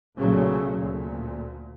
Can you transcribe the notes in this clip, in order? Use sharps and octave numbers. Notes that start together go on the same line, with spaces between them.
B1 A#2 C#3 F#3 A3
D2 A#2